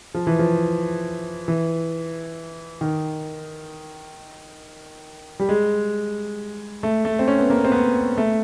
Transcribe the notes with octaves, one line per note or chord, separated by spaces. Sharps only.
F3
E3
F3
E3
D#3
G3
G#3
A3
A3
C4
C#4
B3
A#3
C4
B3
A3